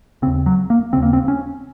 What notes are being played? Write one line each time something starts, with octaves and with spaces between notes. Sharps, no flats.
D#2 C#3 C4
F#3
A#3
D#2 C#3 C4
A#3
C4
C#4